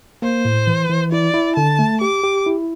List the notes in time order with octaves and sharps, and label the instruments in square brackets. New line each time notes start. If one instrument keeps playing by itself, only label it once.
[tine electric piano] A#3 [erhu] C5
[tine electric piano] A2
E3
E3
[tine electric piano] E4 [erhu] D5
[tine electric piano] E4
[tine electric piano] D3 [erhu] A5
[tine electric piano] A3
[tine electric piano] G4 [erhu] D6
[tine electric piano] G4
E4